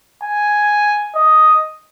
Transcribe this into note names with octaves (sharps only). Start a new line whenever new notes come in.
G#5
D#5